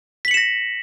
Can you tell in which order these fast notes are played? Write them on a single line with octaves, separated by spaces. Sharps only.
B6 F#7 C#7 E7 A#6